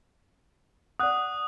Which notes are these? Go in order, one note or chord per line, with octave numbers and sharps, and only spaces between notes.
D5 F#5 D#6 F#6